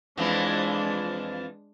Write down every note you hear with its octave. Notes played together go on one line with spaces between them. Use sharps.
F2 E3 F3 G#3 D4